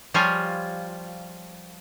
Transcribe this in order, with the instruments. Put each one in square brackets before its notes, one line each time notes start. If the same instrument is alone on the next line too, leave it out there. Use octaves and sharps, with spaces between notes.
[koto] F3 G3 F4 C#5 G#5